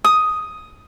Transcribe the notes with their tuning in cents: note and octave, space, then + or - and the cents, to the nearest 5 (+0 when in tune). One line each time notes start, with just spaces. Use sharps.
D#6 +5